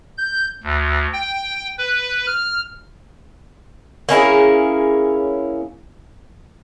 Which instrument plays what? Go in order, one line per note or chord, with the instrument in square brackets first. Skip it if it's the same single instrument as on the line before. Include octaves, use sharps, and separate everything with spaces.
[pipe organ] G6
D2
G5
B4
F6
[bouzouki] A#3 C#4 E4 G#4